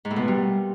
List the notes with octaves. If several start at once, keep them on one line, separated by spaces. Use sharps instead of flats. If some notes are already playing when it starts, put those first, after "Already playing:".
G#2
A2
B2
A#2
G3